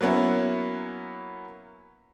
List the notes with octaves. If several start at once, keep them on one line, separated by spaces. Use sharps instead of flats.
F#3 A#3 B3 C#4 E4